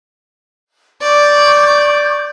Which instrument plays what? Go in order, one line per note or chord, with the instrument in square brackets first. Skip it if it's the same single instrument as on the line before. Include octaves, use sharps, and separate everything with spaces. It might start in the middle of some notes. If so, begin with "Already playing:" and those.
[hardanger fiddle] D5 [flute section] C#6 D6 G6